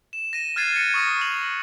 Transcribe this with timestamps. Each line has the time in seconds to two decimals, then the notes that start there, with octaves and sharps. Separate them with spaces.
0.13 E7
0.33 A#6 D#7 E7
0.56 F6 F#6 G#6 A6 C7 D#7
0.76 G#6 A6 C#7
0.94 C#6 D#6 F6 A#6
1.21 F7 F#7